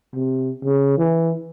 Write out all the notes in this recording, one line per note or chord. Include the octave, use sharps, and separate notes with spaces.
C3
C#3
E3